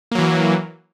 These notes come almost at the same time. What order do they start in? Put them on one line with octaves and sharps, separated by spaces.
A#3 F#3 E3